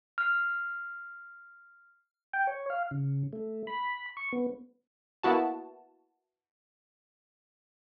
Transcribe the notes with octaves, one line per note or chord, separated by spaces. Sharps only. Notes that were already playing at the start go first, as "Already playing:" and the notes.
F6 C7
G5
C#5
F5
C#3
A3
B5
C#6
B3
A#3 B3 E4 F#4 A5